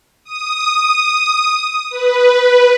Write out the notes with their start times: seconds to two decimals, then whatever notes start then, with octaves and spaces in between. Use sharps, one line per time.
0.24 D#6
1.90 B4